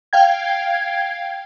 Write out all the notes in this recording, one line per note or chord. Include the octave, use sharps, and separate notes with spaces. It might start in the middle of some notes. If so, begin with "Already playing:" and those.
F5 G5 G#6